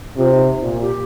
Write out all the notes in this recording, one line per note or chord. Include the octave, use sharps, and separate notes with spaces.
C3 F4
D#4
A#2 F4
G4